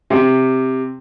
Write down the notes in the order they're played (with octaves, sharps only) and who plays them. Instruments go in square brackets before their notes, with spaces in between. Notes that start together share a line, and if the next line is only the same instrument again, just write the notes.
[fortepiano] C3